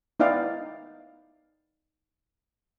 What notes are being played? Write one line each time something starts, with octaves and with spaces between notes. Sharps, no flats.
B3 D#4 E4 D5 F5 G5